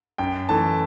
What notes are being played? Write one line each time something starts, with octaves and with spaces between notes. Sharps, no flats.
F#2 G5
E3 A3 A5